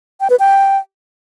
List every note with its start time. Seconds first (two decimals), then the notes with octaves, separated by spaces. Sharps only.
0.20 G5
0.30 B4
0.39 G5